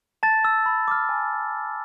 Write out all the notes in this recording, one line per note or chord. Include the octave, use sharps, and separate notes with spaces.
A5 A6
E6
B5
D6 F6
G#5